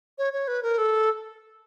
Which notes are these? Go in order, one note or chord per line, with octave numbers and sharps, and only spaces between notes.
C#5
C#5
B4
A#4
A4